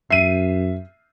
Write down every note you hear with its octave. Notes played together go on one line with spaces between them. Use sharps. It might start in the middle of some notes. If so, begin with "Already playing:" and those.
F#2 E5 C7 D#7